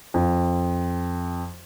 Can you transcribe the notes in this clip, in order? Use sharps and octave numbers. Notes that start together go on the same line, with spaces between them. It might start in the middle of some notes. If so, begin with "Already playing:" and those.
F2